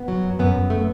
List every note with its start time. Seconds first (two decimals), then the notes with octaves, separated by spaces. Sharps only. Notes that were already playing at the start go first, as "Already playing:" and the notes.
Already playing: B3
0.08 F#3
0.23 F#2
0.39 F#2 B3
0.55 F#2
0.70 A3